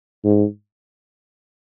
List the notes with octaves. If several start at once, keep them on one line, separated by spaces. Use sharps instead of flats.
G#2